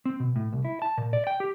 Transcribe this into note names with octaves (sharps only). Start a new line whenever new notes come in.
C4
B2
A2
C2
E4
A5
A#2
D5
G5
G4